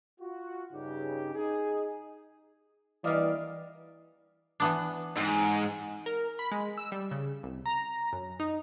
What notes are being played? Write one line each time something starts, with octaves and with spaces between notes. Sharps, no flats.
F4 F#4
G2 C#3 D#4 G4
D#4 G#4
E3 G3 A#3 D5 D#5 F5
E3 B3 D4
G#2 C4
A#4
B5
G#3
E6
G3
C#3
C2
A#5
F#2
D#4